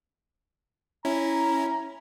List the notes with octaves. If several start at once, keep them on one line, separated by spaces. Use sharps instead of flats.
C#4 E4 A#5